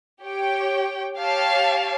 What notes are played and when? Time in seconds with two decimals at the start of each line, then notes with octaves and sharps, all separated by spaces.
0.23 G4 C#5 G5
1.18 G4 C#5 F5 A5